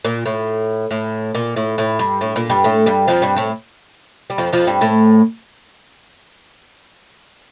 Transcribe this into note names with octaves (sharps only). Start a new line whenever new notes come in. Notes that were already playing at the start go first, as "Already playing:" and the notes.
A#2
A2
A2
A#2
A2
A2
G2
A2
A#2
G2 G3
A2 A3
G2 G3
F2 F3
G2 G3
A2 A3
G3
F2 F3
F2 F3
G2 G3
A2 A3